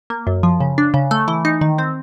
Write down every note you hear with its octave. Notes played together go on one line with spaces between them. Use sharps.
A#3
F#2
F3
C#3
D4
C#3
A3
E3
D#4
D#3
C4